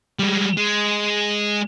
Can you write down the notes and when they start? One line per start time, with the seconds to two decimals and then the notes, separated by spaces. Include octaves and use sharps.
0.19 G3 G#3
0.57 G#3